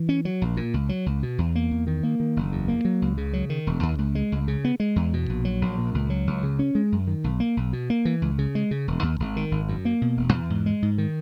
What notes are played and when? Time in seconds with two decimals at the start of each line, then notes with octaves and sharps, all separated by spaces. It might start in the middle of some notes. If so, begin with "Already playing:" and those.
Already playing: E3
0.09 C#4
0.25 F#3
0.42 A#1
0.57 A#2
0.74 C#2
0.89 F#3
1.06 C#2
1.23 B2
1.38 E2
1.55 A#3
1.71 E2
1.87 D#3
2.03 A#3
2.20 D#3
2.36 F#1
2.52 E2
2.68 A#3
2.85 F#3
3.02 C#2
3.17 C#3
3.33 F#3
3.50 D#3
3.67 E1
3.83 D#2
3.99 C#2
4.15 G#3
4.32 C#2
4.48 C#3
4.65 B3
4.80 G#3
4.96 E2
5.13 B2
5.30 A#1
5.45 F#3
5.62 A#1
5.78 A#2
5.94 C#2
6.10 F#3
6.27 C#2
6.43 C#3
6.59 C#4
6.75 G#3
6.92 F#2
7.07 D#3
7.24 B1
7.40 A#3
7.57 B1
7.73 B2
7.90 A#3
8.05 E3
8.22 C#2
8.38 C#3
8.55 G#3
8.71 C#3
8.88 E1
9.03 D#2
9.20 G#1
9.36 D#3
9.52 G#1
9.69 F#2
9.85 A#3
10.02 B2
10.17 E1
10.33 E2
10.50 G#2
10.66 G#3
10.82 G#2
10.98 D#3